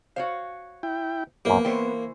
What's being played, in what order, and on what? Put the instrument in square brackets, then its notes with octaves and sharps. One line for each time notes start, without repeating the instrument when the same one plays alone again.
[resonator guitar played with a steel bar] F#4 C#5 F5 [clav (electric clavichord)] C5
[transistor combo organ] E4 G5
[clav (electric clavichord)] A#1 F#2 [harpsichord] A#3 [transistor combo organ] B3 [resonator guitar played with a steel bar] G4
[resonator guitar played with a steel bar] E3 C5 C#5 [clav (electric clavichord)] G5